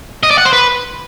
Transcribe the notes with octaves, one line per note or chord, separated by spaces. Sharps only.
D#5
D5
F#5
C5
B4